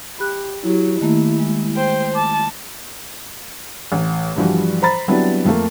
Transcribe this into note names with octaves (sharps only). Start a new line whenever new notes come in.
G4 B5 F#6
F#3 E4 G4
D#3 A3 A#3 E4
G#3
C5 G5
A5 D6
A1
G2 E3 F3 G3 F#4
C5 A#5 B5 A6
F#3 G3 B3 C4 D4 E4
F2 F3 A3 A#3